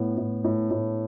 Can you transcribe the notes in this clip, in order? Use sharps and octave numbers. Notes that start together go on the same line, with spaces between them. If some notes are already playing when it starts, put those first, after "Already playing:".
Already playing: A2 B3
A2
A2
A2